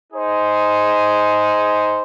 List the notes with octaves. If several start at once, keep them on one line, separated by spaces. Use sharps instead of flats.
D#4 G#4 C5